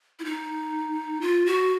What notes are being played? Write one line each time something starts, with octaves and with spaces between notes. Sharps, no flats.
E4
D#4
F4
F#4